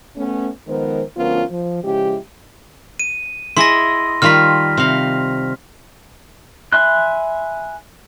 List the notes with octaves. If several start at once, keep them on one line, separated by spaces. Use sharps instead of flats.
A3 B3 C#4
D#3 F3 G#3 B3 A#4 C5
D2 F3 B3 C#4 F4 A#4
F3
C#3 F3 G#3 E4 G4
D#7
E4 G#4 D#5 C6 A#6
D#3 G3 F4 F6 B6
C3 F5
E5 G#5 B5 C6 F#6